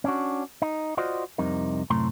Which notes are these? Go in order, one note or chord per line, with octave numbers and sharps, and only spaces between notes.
C#4 D4 F#4
D#4
F4 F#4 C5 D5 D#5
C2 F2 C3 D#4 A#4
F#2 A2 C3 A3 A#5 C6